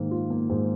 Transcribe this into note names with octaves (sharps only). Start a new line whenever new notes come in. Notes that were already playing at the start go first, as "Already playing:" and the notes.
Already playing: G#2 D#3 A#3
F4
A#3
G#2